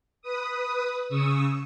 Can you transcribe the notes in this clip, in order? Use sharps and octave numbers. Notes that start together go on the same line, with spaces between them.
B4 D#6
C#3 C#6 D#6 E6